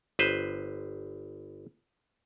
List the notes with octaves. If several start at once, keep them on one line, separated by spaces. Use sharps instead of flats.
G1 B4 C5